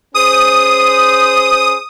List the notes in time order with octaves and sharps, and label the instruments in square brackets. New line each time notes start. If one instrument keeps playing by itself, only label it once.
[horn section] C#4 G#4 C5 [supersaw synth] D#6